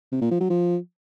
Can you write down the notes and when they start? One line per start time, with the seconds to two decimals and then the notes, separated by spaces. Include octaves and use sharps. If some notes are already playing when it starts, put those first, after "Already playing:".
0.12 C3
0.22 A#2
0.31 F3
0.40 F#3
0.50 F3